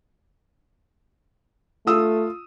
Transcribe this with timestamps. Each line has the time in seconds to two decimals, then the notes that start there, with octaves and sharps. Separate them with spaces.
1.87 A3 F4 D#6 E6